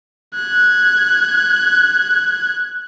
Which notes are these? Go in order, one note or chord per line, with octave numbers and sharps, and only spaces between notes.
F#6 G#6